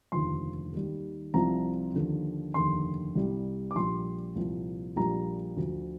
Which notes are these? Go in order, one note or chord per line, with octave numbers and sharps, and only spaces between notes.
F1 D#2 D3 F3 C6
D#2 D#3 G3
C2 C3 F3 A#5
D#2 D3 F3
F1 D#2 D3 C6
C2 C3 G3
D6
A#1 A#2 G3 C6
C2 A#2 F3
A#1 A#2 G3 A#5
D2 D3 F3